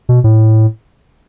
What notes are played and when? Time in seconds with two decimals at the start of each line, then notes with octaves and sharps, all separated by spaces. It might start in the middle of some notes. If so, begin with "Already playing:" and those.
0.09 B2
0.24 A2